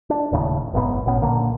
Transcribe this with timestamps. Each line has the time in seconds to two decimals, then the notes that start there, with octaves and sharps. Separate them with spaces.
0.10 D4
0.32 D#1 D#2 A2 C#3
0.73 F#1 B1 G#2 B3
1.06 A1 A#2 B3 C#4
1.22 B1 A#2 D3 A#3